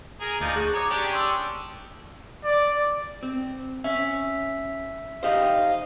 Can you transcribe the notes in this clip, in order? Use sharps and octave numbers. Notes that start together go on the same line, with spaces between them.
G#4 A#4
D2 F3 D#4 D5
F#4 G#4 F#6
C#5 A#5 D6 D#6
C#4 D4 G4
C6 E6
D5
C4
C#4 E5
D#4 G4 C5 D#5 F5